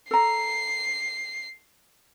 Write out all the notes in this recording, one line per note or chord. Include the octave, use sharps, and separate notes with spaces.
A4 A#5 C7